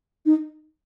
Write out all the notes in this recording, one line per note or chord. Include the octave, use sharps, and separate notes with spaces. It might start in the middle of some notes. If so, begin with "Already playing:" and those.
D#4